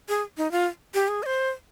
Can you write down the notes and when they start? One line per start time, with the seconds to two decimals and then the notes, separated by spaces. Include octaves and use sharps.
0.09 G#4
0.37 D#4
0.51 F4
0.94 G4
1.08 G#4
1.23 D#5
1.26 C5